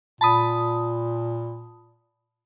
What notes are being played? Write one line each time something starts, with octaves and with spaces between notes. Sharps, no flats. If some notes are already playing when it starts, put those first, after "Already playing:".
A#2 A5 B5 D#6